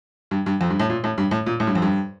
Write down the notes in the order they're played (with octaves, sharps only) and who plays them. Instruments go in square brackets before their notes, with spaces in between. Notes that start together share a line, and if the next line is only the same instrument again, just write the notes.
[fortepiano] G2
G2
F2
G2
A2
A#2
A2
G2
A2
A#2
A2
G2
F2
G2